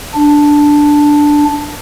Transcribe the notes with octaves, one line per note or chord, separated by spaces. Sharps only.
D4